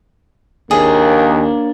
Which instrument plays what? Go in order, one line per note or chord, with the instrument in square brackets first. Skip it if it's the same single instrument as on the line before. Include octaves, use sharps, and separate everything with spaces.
[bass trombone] D#2 [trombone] A#3 [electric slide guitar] D4 C#5 [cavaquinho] G#4